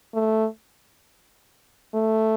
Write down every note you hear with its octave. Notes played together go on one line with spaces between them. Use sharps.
A3
A3